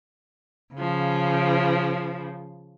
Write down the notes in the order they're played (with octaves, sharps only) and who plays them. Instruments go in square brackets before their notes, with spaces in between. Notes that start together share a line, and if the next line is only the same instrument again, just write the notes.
[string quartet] C#3 F3